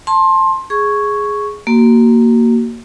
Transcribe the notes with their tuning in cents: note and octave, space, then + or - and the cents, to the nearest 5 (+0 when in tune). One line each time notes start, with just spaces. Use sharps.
A5 +5 C6 +20
G#4 +0 C#6 +0
A#3 -5 F#4 +30